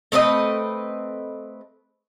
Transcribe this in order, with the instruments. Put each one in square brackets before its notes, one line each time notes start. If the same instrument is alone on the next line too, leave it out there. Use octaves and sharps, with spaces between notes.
[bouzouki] A3 C4 B4 D#5